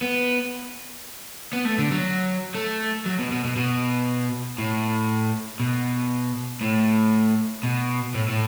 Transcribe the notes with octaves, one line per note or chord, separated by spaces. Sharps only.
B3
B3
A3
D3
F#3
A3
F#3
B2
B2
B2
B2
A2
B2
A2
B2
A2
A2